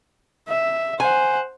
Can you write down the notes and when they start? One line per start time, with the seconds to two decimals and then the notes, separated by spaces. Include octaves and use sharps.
0.49 E5
1.00 C5 F#5 G#5